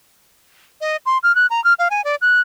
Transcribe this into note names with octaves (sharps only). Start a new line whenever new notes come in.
D#5
C6
F6
F#6
A#5
F6
F5
G#5
D5
F#6